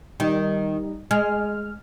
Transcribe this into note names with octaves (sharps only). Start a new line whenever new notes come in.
D#3 G3 D#4
G#3 F6